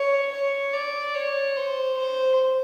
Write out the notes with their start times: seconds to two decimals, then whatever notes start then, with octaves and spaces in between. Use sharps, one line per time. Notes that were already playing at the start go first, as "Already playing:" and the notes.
Already playing: C#5
0.32 C#5
0.73 D5
1.15 C#5
1.56 C5
1.98 C5